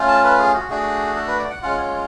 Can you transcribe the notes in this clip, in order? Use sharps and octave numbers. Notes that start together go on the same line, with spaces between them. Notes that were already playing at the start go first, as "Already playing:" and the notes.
Already playing: A3 C#4 F4
A5
B4
G#4
F#4
A3 D4 F#4 G#4
A4
B4
D5
F#5
G#3 C#4 F4 F#5
C#5